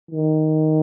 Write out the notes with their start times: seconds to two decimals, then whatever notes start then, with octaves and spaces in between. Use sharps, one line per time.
0.11 D#3